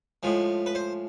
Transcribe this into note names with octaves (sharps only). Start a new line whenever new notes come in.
A2 F3 G#3
B4
C5